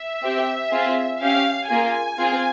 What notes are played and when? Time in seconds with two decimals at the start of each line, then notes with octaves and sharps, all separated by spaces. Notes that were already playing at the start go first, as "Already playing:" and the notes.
Already playing: E5
0.22 C4 G4
0.71 C4 F4 G#4
1.21 C#4 G4 F5
1.69 A#3 F4 G#4 G#5
2.18 C4 F4 G#4